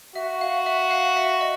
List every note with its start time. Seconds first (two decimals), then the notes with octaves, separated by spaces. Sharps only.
0.15 F#4 E5
0.41 F5
0.66 E5
0.91 F5
1.16 E5
1.41 D#5